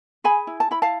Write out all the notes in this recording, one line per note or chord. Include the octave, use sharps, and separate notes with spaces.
G#4 G#5 B5
E4
A5
E4 B5
F5 A5